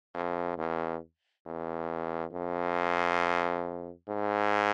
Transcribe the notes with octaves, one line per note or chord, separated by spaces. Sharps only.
F2
E2
E2
F2
G#2